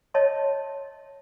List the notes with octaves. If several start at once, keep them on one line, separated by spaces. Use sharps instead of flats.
C#5 D#5 E5 A5 C6